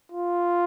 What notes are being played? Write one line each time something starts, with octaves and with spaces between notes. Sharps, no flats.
F4